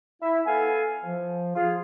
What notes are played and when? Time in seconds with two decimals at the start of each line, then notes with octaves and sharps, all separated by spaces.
0.22 E4 E5
0.46 B3 A4 F5 G#5
1.03 F3
1.55 F4 G#4 F5